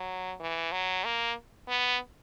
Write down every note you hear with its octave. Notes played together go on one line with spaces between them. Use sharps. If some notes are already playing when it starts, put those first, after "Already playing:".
Already playing: F#3
E3
F#3
A#3
B3